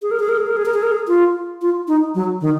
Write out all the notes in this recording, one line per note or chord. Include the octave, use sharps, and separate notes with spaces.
G#4
A#4
G#4
A#4
G#4
A#4
G#4
A#4
G#4
A#4
G#4
F4
F4
D#4
F#3
D#3